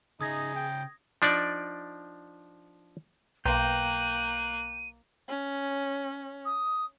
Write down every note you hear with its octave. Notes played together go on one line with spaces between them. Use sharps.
C#3 D#4 G#4 E5 D#6 G#6 A#6
G5
F3 D4 D#4 D5
B1 A#3 G5 A#5 F#6 D#7
C#4
D#6